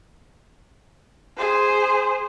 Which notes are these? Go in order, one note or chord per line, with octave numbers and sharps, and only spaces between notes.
G#4 C5